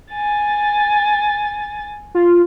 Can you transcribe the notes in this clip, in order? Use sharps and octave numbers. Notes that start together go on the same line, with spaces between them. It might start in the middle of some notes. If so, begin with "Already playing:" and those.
G#5 A6
F4